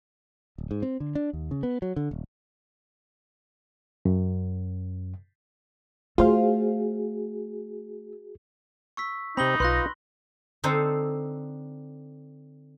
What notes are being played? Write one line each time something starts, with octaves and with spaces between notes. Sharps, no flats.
D1
G#2
C4
D3
D4
D#2
C#3
B3
F#3
D3
D#1
F#2
A3 F4 F#4 G#4 C5 F5
C#6 E6 B6
C3 C4 D#4 B5 F#7 G7
B1 F4 B4 C6 F#6 A#6
D3 C4 D#4 A4 C5